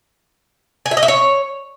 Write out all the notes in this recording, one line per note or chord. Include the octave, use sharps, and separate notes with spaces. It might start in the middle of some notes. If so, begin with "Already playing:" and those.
G#5
E5
D#5
E5
C#5